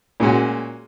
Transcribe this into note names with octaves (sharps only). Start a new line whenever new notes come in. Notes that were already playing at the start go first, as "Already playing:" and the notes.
A#2 G#3 C#4 F#4